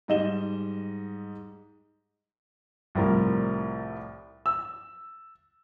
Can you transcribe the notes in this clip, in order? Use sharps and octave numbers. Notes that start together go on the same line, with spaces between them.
G#2 G3 D#5 E7 G7
C2 A2 F3 G3 A#4
E6